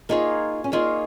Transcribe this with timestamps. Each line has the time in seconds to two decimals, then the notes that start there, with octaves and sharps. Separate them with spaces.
0.09 A#3 D#4 F4 G#4 C#5
0.64 C#4
0.72 A#3 D#4 F4 G#4 C#5